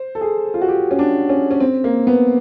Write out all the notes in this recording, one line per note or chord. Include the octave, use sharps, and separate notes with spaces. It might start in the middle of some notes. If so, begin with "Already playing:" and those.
Already playing: C5
A4
G#4
F4
F#4
G4
C#4
D4
C#4
C#4
C4
A#3
B3